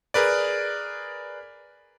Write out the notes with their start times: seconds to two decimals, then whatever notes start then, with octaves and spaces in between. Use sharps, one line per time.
0.14 G#4 A#4 B4 D5